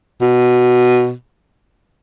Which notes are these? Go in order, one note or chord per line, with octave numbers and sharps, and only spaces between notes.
B2